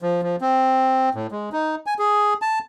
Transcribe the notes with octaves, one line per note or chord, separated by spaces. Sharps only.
F3
F3
C4
A2
G#3
D#4
G#5
G#4
A5